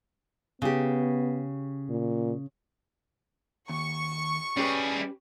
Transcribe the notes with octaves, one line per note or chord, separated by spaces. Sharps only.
C#3 B3 G4
A#2
D#2 C#6
G3 C#4 G4 G#4 B4